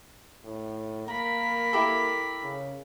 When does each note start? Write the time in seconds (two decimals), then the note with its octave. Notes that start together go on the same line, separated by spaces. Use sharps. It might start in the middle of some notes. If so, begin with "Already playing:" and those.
0.44 A2
1.08 A#3 A#4 A#5 B5
1.73 E4 G4 A4
2.43 C#3